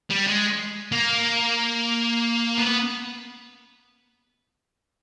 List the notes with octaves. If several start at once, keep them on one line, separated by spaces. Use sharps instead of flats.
G3
G#3
A#3
B3